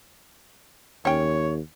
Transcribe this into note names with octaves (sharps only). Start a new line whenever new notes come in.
D#2 C#4 C#5 G5